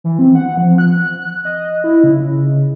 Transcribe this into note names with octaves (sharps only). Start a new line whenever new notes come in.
E3
C4
F#5
F3
F#6
D#5
E4
C#3